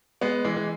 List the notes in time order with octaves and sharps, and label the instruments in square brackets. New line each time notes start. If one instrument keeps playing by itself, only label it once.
[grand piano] G#3 B3
E3 G#3
E3